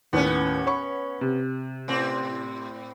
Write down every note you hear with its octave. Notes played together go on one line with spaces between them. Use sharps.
D#2 A2 B3 C#4
C#5 B5 C#6
C3
A2 C4